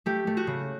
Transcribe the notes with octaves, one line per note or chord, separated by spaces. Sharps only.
A3 G4
A3
F#4
C#3